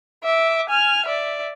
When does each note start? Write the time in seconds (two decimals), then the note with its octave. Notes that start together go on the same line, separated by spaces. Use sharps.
0.23 E5 D6
0.69 G#5 F6
1.05 D5 E5